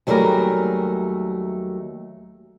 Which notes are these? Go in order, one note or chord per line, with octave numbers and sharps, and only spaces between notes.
D#2 F#3 G3 A3 G#4 A#4